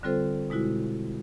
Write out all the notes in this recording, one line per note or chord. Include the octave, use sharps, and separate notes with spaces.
D3 G3 C4 F4 A4 C5
B2 G#3 E4 F#4